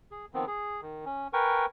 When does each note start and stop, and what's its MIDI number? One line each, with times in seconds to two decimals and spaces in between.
0.11 0.26 68
0.34 0.45 51
0.34 0.45 53
0.34 0.45 59
0.34 0.45 60
0.47 0.81 68
0.82 1.05 51
1.06 1.28 61
1.33 1.66 70
1.33 1.66 71
1.33 1.66 79
1.33 1.66 80
1.33 1.66 85